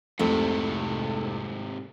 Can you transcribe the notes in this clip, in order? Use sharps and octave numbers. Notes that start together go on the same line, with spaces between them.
C2 F2 G#2 C3 A3 A4